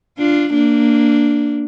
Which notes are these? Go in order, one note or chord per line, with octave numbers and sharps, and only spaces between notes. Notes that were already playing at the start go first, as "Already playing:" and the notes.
D4 F4
A#3 D4